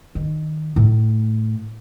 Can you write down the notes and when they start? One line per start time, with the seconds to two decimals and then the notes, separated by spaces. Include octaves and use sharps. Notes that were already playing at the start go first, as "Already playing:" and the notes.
0.15 D#3
0.76 A2 A3